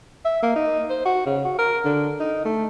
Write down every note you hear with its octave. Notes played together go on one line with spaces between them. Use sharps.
E5
A#3
D#4
C5
F#4
C#3
F#4
A#4
D3
D#4
A3